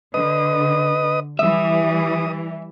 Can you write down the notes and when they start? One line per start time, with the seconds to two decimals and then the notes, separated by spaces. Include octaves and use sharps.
0.14 D3 B4 D#5 D#6
1.39 E3 G3 E5 D#6